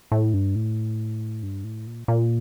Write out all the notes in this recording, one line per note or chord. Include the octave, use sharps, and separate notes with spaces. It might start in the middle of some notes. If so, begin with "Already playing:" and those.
A2
G2
A2
G2
A2
A#2
A#2